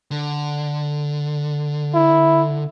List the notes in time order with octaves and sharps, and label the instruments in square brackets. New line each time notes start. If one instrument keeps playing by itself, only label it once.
[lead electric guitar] D3
[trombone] E4